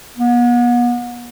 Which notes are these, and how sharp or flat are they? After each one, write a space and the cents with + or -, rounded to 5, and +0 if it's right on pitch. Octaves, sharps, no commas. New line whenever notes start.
B3 -40